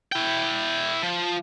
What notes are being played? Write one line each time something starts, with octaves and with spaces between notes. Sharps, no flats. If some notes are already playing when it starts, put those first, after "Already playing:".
E4 G5
F3